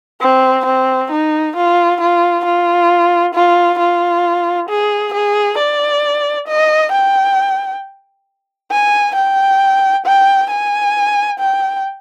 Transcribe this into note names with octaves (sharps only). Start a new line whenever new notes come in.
C4
C4
D#4
F4
F4
F4
F4
F4
G#4
G#4
D5
D#5
G5
G#5
G5
G5
G#5
G5